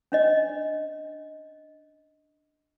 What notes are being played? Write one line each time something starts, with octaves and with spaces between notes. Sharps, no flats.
C#4 D4 D#5